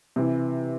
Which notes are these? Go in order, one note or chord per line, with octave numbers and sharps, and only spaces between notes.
C3 E3